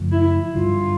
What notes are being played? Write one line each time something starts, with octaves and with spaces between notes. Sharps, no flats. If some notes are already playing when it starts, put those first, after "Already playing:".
Already playing: F#2 C#3 F3 A3
E4
G1 G2 D3 F#3 F4